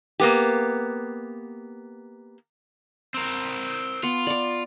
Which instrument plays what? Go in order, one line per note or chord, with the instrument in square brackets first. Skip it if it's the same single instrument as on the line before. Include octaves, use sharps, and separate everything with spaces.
[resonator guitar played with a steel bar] A#3 B3 G4
[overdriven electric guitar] C4 A#4
[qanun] B3 [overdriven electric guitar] F4
[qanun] D5 D6